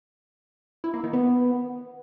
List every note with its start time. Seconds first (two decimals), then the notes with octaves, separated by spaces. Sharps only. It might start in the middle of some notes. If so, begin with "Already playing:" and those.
0.84 E4
0.94 A#3
1.03 D#3
1.13 B3